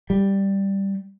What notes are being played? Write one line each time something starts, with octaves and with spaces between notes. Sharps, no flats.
G3